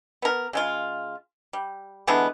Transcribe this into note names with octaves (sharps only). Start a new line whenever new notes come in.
B3 A#4
C#3 G#3 F4
G3
D3 E3 G#3 B3